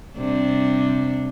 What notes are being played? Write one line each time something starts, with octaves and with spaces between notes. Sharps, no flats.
C3 G3 D4